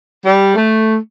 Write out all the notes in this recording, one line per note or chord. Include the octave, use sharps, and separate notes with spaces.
G3
A3